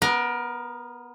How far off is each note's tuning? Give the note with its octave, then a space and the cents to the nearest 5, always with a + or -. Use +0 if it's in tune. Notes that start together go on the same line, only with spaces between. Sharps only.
B3 -10 A#4 +20